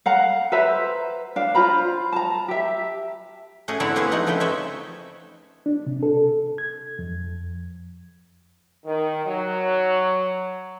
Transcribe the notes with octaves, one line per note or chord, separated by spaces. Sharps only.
F5 F#5 A#5
B4 C5 E5 A#5
D4 F5
F4 C5 A#5 B5
A5 A#5
G4 E5
A3 C#4 F#4 G#4
D3 C4 E4 E5 F#5 A#5
A#3 C4 G#4 B4 C#5
F3 A3 D#4 F#5
C#3 F3 A3 B4 G5
C4 C#5 D#5 E5
D4
C3
A4
G#6
F2
D#3
F#3